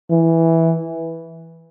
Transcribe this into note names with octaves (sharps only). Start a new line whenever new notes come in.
E3